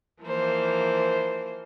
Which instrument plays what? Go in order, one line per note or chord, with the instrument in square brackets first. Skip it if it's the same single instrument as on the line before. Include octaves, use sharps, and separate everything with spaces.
[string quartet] E3 F3 A#3 C5